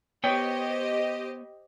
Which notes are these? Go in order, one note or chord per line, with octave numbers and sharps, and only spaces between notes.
B3 G4 C5 C#5 D#5 G5